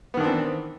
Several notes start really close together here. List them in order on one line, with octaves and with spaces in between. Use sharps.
B3 D#3 D4 C4 E3